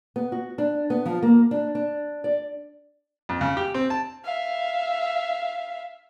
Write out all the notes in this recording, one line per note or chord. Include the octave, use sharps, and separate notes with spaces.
B3
F#4
D4
B3
F3
A#3
D4
D4
D5
F2
C#3
G4
C4
A5
E5 F5